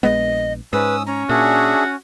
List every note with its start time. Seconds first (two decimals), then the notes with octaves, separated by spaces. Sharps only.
0.03 A#1 G#3 B3 D#5
0.73 G#2 C#4 B4 D#6 E6
1.06 C#4 A#5
1.29 A#2 D4 F#4 G#4 E5